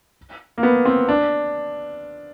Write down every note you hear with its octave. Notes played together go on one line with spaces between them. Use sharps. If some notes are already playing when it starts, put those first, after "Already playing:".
A#3
B3
C4
D4